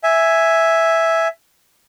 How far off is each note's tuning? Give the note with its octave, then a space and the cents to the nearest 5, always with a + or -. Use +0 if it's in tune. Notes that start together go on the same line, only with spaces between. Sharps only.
E5 +0 G#5 +0